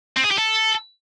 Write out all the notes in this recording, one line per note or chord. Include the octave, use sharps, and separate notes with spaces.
C4
G#4
G4
A4